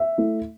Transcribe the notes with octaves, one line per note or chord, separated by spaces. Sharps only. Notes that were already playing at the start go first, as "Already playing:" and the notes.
Already playing: E5
A3 E4